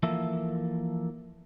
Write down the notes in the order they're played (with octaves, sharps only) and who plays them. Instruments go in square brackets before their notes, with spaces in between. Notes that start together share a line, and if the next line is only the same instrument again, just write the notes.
[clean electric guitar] E3 F3 A#3 A4 E5